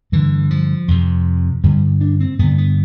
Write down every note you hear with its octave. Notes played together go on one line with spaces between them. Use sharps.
G2 D3 E3
F3
F2 C3
G2 D3 G3
D4
C4
G2 D3 B3
B3